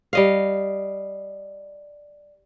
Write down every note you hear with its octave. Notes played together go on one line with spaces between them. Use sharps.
G3 D#5 F5